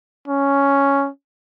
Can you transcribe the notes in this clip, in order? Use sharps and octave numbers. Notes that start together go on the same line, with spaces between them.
C#4